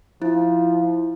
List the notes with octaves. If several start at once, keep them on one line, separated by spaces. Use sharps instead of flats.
F3 E4